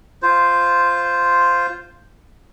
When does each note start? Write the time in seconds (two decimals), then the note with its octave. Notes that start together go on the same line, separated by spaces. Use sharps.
0.22 F4 C5